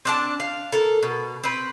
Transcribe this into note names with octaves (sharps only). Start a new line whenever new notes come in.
C4 D4 A5
F5
A4 A#4
B2
C4 B4